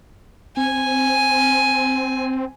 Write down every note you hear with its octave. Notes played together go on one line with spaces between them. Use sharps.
C4 G#5